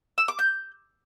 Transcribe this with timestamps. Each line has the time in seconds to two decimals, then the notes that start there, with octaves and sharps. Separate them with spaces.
0.18 E6
0.28 D6
0.39 G6